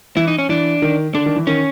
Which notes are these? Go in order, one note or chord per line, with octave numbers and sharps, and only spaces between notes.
E3 E4
D#4
C#4
E3 D4
D#3
D3 D4
D#3
E3
D#3 C#4